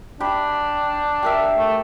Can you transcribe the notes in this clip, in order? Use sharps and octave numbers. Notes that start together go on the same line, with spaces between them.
D4 G4 B5
G4 A#4 E5
A3